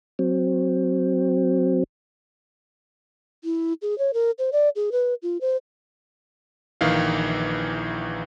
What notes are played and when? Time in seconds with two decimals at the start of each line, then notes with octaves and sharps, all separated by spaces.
0.19 F#3 C4
3.44 E4
3.82 G#4
3.98 C#5
4.14 A#4
4.39 C5
4.52 D5
4.76 G#4
4.92 B4
5.22 F4
5.41 C5
6.81 A#1 D#3 E3 F5